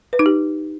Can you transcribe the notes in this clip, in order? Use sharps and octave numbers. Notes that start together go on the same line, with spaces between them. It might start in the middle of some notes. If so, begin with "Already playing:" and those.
B4
D#4
G4